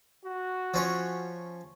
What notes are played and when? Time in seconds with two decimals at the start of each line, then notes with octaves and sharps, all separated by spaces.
0.25 F#4
0.74 F3 C#4 C#5